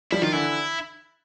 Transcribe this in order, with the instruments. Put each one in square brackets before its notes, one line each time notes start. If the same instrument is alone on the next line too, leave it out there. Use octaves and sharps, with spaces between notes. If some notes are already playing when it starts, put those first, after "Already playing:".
[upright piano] F3 G3 [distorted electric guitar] E4
[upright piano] D#3 F3 [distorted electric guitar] F4
[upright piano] D3 E3 [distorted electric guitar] E4